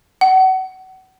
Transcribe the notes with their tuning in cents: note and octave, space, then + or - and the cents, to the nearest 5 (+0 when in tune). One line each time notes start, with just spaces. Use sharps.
F#5 +30